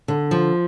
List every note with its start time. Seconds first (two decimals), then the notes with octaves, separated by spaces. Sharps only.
0.08 D3
0.31 F3